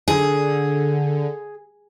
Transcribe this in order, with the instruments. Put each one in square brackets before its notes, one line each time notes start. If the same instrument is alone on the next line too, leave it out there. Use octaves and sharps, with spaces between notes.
[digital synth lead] D3 [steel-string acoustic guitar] G#4